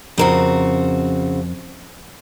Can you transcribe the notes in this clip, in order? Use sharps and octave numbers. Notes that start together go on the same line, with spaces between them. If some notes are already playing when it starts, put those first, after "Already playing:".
F2 C#3 C4 F#4 A#4